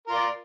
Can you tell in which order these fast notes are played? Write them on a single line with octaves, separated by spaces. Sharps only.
A#4 F4 D5